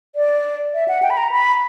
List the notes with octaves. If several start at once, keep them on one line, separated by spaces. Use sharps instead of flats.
D5
E5
F#5
G5
B5
A#5
B5